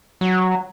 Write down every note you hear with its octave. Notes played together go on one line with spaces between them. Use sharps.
F#3